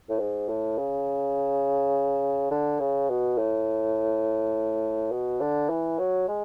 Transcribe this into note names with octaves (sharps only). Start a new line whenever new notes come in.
A2
G#2
A2
C#3
D3
C#3
B2
A2
B2
D3
E3
F#3
G#3